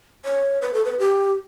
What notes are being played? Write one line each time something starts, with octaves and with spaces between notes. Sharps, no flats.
C#5
B4
A4
B4
G4